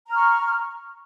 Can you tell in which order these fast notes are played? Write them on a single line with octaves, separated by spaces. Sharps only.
A#5 F6 C#6